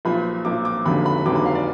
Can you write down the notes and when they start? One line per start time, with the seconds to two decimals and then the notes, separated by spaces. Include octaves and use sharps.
0.05 B1 A#2 F3 B5
0.45 B1 A#2 F3 D6
0.65 D6
0.85 F1 D#2 D3 F#3 B5
1.06 B5
1.25 F1 D#2 D3 F#3 D6
1.36 B5
1.46 F5
1.55 D5